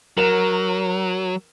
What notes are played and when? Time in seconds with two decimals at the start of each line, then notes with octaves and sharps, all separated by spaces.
0.17 F#3 A#4 E7